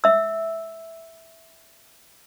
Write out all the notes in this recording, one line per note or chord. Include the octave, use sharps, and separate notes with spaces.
E5 E6